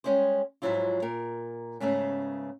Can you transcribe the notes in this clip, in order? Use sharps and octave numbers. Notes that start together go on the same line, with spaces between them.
G3 G#3 C#4 E4 G#4 C5
G#2 B2 F3 F#3 E4 F4
A#2 A#4
G#2 C#3 A3 B3 C#4